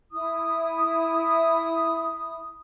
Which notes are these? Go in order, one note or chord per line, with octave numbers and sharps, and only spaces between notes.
E4 D#6